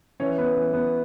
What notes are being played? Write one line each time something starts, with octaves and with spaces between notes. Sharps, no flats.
E3 C#4 C#5
B3 B4
E3
B3 B4